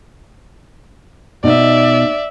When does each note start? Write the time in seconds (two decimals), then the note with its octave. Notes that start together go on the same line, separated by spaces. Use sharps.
1.44 B2 D#4 D5 E5